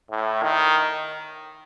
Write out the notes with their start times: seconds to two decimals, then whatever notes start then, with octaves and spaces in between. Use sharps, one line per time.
0.11 A2
0.43 D#3